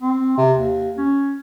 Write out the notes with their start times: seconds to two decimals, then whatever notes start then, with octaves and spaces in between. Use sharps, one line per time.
0.02 C4
0.38 C3
0.57 D#2
0.98 C#4